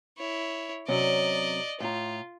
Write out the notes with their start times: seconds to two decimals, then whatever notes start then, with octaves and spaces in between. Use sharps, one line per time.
0.19 E4 C#5
0.88 C3 F#3 C#4 D5 D#5
1.80 A2 F4 A#5